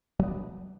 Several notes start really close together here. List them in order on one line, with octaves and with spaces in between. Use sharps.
F#3 B3 D4